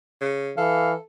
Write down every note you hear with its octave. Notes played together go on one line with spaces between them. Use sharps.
C#3
E3 A4 F5